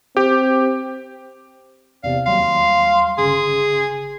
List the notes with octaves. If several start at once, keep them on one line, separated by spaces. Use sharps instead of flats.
C4 G4
E2 C3 D5 F5
D#2 F#3 G3 F5 C6
G1 C#3 G#4